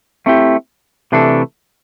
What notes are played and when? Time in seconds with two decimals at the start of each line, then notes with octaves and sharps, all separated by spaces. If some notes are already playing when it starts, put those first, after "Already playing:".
0.26 A3 C4 E4 G4
1.12 C3 E3 A3 D4 A4